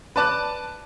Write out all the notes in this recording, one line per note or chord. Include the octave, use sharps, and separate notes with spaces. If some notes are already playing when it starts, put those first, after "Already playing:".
B4 D5 A5 D6 F#6